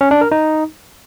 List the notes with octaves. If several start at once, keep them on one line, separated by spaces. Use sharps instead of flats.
C#4
D4
A#4
D#4